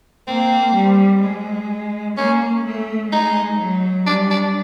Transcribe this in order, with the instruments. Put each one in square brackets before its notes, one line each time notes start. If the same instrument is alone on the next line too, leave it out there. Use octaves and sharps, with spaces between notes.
[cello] A#3 [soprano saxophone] C4
[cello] G3
G#3
[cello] A#3 [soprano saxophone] C#4
[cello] A3
[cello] G#3 [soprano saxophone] D#4
[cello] F#3
[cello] G3 [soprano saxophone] D4
[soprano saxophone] D4